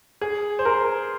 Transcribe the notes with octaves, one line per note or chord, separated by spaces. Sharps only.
G#4
C5
A#4